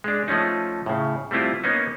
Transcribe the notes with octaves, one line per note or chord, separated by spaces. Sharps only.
G#3 D4
F3 A3 C#4 D#4
A2 C#3
G3 A3 C4 E4 F4
A#3 B3 C#4 D#4